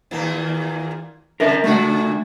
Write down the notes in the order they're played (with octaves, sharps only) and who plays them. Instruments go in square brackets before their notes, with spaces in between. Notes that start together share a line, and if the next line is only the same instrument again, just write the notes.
[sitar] D#2 A#2 A#3
[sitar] C#3 [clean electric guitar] A#4 E5
[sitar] A#2 C#3 F#4 [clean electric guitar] A3